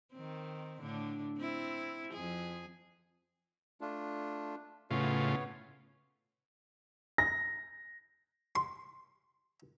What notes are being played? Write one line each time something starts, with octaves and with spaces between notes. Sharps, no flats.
D#3 C4
A2 D3 D4
C4 E4
F2 G#4
A3 D4 F4
A2 C#3 B3 F4 C#5
A#6
C6